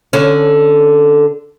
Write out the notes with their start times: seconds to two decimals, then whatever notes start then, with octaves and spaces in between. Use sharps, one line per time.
0.13 D3 C#4